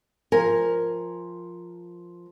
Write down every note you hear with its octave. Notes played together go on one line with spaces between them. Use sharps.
F3 A#4 G#5